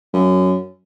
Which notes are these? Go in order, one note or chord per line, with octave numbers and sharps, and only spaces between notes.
F#2